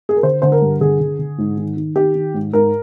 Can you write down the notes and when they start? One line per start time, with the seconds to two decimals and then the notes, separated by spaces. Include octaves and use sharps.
0.09 G#4
0.16 A#4
0.23 D3 C5
0.42 D3 C5
0.52 A#4
0.62 G2
0.81 D3 G#4
1.00 D3
1.19 D3
1.38 G#2
1.57 D#3
1.77 D#3
1.96 D#3 G4
2.15 D#3
2.34 G#2
2.53 G#2 A#4